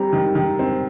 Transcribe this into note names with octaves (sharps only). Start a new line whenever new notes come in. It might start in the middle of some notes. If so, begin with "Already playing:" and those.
Already playing: G3 C4 A#5
D#3
D#3
C4